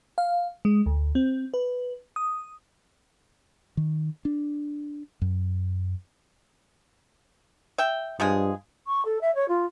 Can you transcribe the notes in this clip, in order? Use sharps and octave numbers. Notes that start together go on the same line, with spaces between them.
F5
G#3
D2
C4
B4
D#6
D#3
D4
F#2
E5 G5
G2 F3 G#3 G#4
C#6
A4
E5
C#5
F4